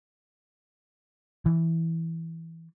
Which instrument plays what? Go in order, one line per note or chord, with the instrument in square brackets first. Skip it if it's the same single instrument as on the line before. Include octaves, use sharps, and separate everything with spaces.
[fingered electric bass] E3